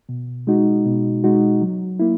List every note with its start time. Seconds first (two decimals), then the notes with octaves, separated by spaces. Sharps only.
0.09 B2
0.47 G#3 D#4 F#4
0.85 B2
1.24 G#3 D#4 F#4
1.61 F#3
1.99 A#3 E4